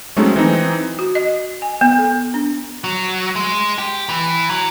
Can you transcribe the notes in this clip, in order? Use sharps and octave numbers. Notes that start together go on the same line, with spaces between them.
F#3 G#3 A3 C4 C#4 D#4
E3 C4 D#4
F#4
D#5
G#5
B3
A4
D4
F#3
G#3
G4
E3
F#3